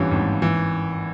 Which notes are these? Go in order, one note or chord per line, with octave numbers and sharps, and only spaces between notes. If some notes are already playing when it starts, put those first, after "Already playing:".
Already playing: G#1 G2 E3 C#4 F4 G4
G#1
E3